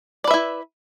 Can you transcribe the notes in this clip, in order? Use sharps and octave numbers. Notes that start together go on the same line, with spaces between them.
E4 B4 D5 E5